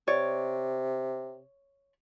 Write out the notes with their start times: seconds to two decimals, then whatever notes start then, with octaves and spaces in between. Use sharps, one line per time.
0.08 C3 C#5 D5